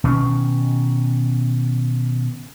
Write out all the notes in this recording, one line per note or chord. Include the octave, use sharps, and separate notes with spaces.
B2 D#3 C#4